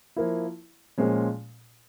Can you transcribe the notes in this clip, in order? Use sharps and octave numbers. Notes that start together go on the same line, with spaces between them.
F3 A#3 E4
A#2 F3 G#3 C#4